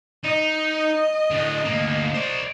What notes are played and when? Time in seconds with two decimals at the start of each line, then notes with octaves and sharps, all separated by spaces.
0.24 D#4 D#5
1.31 A2 D3
1.65 D2 A#3
2.15 C5 D5